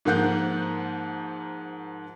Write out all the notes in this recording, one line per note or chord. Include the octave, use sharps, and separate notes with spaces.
G#2 F3 A#3 F#5 F#6 G6